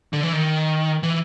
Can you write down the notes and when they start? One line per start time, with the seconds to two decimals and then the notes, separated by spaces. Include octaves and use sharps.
0.13 D3
0.23 E3
0.33 D#3
1.03 E3